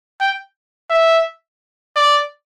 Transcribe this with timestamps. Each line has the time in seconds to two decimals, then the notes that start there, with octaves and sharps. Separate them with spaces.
0.21 G5
0.90 E5
1.96 D5